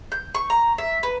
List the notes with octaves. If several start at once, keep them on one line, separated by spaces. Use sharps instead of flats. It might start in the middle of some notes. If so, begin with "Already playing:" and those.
G6
C#6
A#5
E5
B4